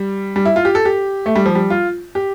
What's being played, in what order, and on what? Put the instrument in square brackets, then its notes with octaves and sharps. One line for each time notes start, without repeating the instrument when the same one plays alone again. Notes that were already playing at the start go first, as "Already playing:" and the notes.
Already playing: [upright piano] G3
G3
E4
F4
G4
A4
G4
A3
G3
F3
G3
F4
G4